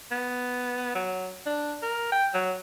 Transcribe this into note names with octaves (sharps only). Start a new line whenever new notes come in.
B3
F#3
D4
A#4
G5
F#3